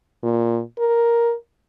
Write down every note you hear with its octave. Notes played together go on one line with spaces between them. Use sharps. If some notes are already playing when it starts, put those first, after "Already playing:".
A#2
A#4